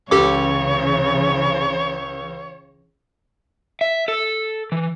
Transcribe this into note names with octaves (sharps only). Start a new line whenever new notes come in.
C#2 C#3 E3 G4 A4 C#5 D6
E5
A4
E3